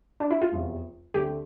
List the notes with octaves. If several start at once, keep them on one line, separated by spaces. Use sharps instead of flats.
D4
E4
F4
F1 E2 C3
D2 D3 A3 C4 G4